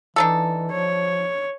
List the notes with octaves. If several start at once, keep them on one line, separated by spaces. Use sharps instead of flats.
E3 D4 D#4 A4
F3 C#5